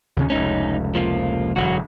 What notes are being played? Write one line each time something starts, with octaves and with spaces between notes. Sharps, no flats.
D#2 C#3 C#4
F1 C#2 C#4 D#4
F3 A#3 F4
E1 F#2 D3 F#3 F#4